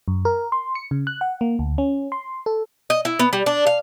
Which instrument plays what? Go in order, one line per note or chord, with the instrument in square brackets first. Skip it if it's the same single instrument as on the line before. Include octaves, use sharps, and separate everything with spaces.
[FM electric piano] F#2
A#4
C6
C#7
C#3
F#6
F#5
A#3
D2
C#4
C6
A4
[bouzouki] D#5
E4
B3
G3
D4
F5